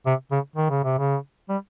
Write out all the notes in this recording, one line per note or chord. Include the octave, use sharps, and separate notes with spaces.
C3
C#3
D#3
C#3
C3
C#3
G3